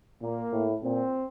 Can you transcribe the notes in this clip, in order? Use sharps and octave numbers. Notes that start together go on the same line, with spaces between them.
A#2 A#3
A2
A#2 C4